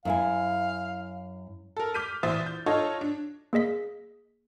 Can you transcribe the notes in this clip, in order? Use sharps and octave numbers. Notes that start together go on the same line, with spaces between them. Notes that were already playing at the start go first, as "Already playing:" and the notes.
F#2 E4 F5 G#5
A4 A#4
D6 F6 G6 B6 D#7
A#1 E3 C5 E5 D#6 A6
G6
D#4 F4 A4 C#5 D#5
D4
A#3 G#4 D#5 B6